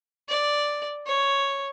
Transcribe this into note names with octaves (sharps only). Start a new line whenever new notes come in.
D5
C#5